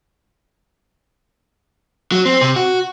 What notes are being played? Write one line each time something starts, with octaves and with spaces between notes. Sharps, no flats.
F#3
C4
C3
F#4